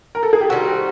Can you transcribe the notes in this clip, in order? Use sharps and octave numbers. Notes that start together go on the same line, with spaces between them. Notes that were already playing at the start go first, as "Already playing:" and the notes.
A#4
A4
G#4
G4
D#3 G3 C4 F#4